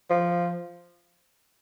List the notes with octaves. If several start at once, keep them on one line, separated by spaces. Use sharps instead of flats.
F3